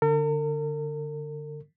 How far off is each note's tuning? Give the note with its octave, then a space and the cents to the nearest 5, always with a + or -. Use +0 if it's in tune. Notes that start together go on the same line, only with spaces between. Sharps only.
D3 +0 A#4 -45